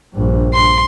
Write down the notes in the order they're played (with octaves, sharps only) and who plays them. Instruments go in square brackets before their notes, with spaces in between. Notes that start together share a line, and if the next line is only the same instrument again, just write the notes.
[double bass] A#1 G2
[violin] C6